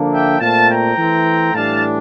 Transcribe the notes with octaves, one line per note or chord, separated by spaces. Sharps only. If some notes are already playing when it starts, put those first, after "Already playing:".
Already playing: D3 F3 A#3 D4
E5 G5
A#2 A3 C4 F5 A5
G5 A#5
E3 A3 C4
A2 E3 G3 D4 F5 A5